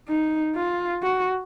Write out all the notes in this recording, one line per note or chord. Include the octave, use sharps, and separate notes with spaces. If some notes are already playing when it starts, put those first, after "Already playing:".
D#4
F4
F#4